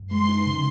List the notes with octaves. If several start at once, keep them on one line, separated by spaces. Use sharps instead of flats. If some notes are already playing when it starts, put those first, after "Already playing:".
Already playing: F#2
G#3 C6
D#4
C#3